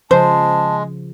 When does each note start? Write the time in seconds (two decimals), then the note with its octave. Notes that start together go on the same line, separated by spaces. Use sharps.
0.11 C#3 F3 G#3 C5 A5